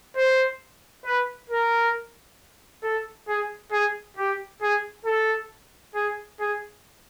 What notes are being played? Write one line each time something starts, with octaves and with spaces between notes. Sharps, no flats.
C5
B4
A#4
A4
G#4
G#4
G4
G#4
A4
G#4
G#4